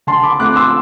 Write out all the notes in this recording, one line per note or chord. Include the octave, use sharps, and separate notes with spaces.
D3 A5 C6
B5 D6
A3 C4 D6 F#6
C6 E6